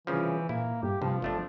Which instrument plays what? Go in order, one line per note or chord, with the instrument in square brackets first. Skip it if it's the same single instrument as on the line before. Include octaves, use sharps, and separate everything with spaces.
[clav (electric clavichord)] C2 C#3 F3 [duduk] E3
[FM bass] A#2 [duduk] A#3 [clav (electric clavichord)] E4
[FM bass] G2 [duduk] G4
[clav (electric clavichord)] G2 [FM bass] C3 [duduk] F3
[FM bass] G1 [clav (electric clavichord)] F2 A3 D4